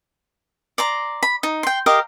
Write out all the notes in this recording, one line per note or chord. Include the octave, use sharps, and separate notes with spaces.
D5 A#5 C6
B5
D#4
G5 C6
G4 A#4 D#5 F5